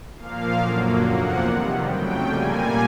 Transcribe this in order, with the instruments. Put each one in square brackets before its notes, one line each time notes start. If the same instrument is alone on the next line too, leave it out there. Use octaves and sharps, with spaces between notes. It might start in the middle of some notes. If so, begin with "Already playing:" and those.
[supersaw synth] A#2 F3 A#3 F5
F#2 D3 F#3 A#3
E2 C3 F3 A#3 F#5
C3 D#3 G3
F2 C#3 F#3 A3 G5
A#2 G3 A#3 G#5